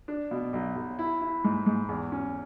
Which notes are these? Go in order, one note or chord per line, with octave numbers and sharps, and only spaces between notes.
D4
B2
B1
B1
E4
E4
G#2
G#2
E2
C#4